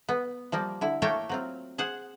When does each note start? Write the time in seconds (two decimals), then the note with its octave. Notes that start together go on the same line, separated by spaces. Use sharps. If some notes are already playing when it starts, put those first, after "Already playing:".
0.09 B3
0.52 F3 G3 A#3
0.81 D3 E4
1.02 A3 A#3 C#5 G5 A5
1.29 F#3 C4 F4
1.78 G#4 C5 F#5